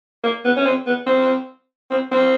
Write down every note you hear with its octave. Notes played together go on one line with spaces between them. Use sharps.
A#3
B3
C#4
C4
B3
C4
C4
C4